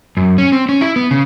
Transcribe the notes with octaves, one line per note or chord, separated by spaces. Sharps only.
F#2
C#4
C4
C#4
E4
B3
C#3